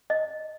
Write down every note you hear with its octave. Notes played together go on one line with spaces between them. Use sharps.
D#5